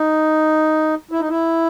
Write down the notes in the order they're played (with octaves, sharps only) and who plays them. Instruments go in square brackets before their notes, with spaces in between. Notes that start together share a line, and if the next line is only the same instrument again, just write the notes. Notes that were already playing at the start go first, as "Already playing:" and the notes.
Already playing: [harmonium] D#4
E4
D#4
E4